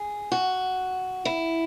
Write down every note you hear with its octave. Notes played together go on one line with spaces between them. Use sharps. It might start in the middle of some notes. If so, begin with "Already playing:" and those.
Already playing: G#4
F#4
E4